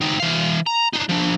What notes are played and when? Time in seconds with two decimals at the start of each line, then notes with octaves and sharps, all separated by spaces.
0.01 C4 D#4
0.20 E3 F5
0.66 A#5
0.93 D4 D#4
1.09 F3 D4